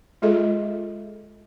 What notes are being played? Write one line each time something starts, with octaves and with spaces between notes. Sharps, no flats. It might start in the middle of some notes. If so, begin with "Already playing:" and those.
G#3 F4 G#4 A4 D#5 E5